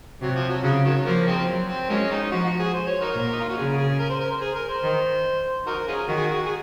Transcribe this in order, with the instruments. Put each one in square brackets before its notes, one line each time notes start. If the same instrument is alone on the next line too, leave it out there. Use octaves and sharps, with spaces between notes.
[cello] C3 [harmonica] F#3
[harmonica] F3
F#3
[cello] C#3 [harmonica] F#3
[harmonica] D#3 F#3
[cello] F3 [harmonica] A#3
[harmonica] D#3 G#3 C4
[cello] F#3
[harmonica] C4
[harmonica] F#3 A#3 C#4 [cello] G#3
[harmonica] G#3 C4 D#4
[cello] F3 [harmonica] F#4
[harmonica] F#4
G#4
C5
C#5
D#4 F#4 A#4
[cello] A#2
[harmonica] D#4
F4
F#4
[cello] C#3 [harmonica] G#4
[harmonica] G#4
A#4
C5
A#4
C5
G#4
A#4
C5
[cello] D#3
[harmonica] D#4 F#4 A#4
C#4 F4 G#4
[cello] D#3 [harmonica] F#4
[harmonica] G#4
F#4
G#4
F#4
G#4